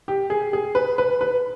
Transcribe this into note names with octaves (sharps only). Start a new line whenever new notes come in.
G4
G#4
G#4
B4
B4
B4